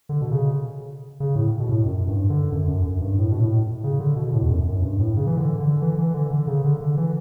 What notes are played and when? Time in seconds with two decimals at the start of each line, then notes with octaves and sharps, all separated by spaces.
0.09 D3
0.21 B2
0.31 C#3
1.20 C#3
1.36 A2
1.60 B2
1.69 A2
1.85 F#2
2.07 G2
2.30 D3
2.52 F#2
2.68 F#2
2.85 F#2
3.01 G2
3.18 A2
3.32 B2
3.40 A2
3.84 C#3
4.00 D3
4.16 B2
4.33 A2
4.42 E2
4.50 F#2
4.67 F#2
4.82 G2
4.99 A2
5.16 C#3
5.27 E3
5.38 D3
5.60 D3
5.82 E3
5.98 E3
6.14 D3
6.31 D3
6.47 C#3
6.64 D3
6.81 D3
6.97 E3